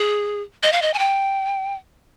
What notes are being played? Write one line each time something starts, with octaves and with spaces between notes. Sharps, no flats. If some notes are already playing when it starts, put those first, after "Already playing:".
Already playing: G#4
D#5
F5
D#5
G#5
G5